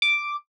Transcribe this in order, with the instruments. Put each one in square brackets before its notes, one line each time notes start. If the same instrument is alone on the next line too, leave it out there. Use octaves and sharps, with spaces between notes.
[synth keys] D6